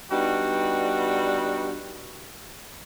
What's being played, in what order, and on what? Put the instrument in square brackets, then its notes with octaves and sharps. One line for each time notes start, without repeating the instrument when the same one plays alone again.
[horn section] G3 B3 D4 D#4 F#4